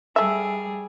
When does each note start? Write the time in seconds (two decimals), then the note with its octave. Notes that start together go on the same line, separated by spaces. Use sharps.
0.16 G3 A3 G#4 E5